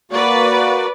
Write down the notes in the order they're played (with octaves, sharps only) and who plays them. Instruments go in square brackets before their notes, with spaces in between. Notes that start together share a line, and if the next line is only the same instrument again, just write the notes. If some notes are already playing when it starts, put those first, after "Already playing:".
[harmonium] A#3 F#4 [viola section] B4 D5